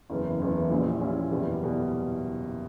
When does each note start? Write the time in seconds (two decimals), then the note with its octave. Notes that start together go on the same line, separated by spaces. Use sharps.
0.10 F#1 E2 C#3 E3
0.40 F#1 E2 C#3 E3
0.70 A#1 A#2 G3 C#4 E4
1.00 A#1 A#2 G3 C#4 E4
1.30 F#1 E2 B2 G3
1.63 B2 G3